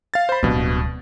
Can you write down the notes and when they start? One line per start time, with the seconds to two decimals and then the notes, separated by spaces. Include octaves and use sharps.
0.14 F5 A6
0.29 C5 B5
0.43 D1 G2 B2